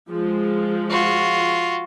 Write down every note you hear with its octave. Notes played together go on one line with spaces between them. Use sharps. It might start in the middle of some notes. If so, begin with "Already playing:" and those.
F3 G#3
F4 F#4